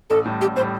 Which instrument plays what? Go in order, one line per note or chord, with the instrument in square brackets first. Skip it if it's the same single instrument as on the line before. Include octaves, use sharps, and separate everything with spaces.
[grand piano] A1 [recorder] A4
[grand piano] A2 G3
[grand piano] A1 [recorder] G4
[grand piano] A2 [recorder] C5
[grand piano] G3